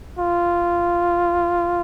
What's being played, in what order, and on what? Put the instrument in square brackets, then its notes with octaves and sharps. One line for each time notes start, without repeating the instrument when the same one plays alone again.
[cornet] F4